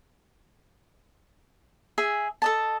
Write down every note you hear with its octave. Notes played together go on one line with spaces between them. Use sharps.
G#4 E5 G#5
A4 D#5 A5